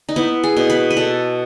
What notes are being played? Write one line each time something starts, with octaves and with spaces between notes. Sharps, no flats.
D#4
B3 E4
G#4
B2
B4
B4
B2 A4